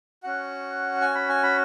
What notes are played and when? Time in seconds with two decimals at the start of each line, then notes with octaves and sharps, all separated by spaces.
0.23 C#4 F#4 F#5
1.01 G#5
1.15 B5
1.29 G#5
1.43 B5